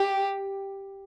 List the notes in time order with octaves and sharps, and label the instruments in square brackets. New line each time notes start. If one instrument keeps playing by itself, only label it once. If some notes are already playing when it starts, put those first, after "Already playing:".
Already playing: [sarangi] G4